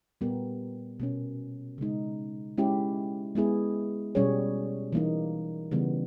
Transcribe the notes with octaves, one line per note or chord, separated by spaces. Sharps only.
A#2 G3 B3 G4 A#4
B2 A#3 C#4
C#3 G#3 D#4
G#3 C#4 E4 G4
G#3 B3 E4 G#4
B2 G3 C#4 G#4 C#5
E3 G3 A#3 D#4
C#3 E3 G3 B3